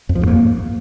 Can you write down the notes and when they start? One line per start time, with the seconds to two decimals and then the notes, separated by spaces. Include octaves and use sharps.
0.09 F2
0.15 F3
0.21 G#2
0.28 A#3